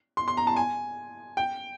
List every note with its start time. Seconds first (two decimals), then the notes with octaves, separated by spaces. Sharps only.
0.17 C6
0.28 C6
0.37 A#5
0.47 A5
0.56 G#5
1.37 G5